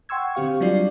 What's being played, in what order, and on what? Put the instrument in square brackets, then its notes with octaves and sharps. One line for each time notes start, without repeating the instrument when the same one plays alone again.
[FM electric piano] F#5 G5 C6 C#6 E6 G#6
D3 C4 G4 F5 C#6
F#3 G3 D4 F4 D5 C7